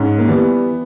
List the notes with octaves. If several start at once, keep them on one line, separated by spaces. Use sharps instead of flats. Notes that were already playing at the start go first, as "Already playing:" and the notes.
Already playing: G#2 C#4
A#3
E3 G3 B3